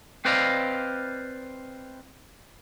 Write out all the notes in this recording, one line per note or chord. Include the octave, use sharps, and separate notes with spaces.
C4 B4 C5 D5 D#5 F5